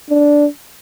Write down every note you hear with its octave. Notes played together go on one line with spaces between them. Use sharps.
D4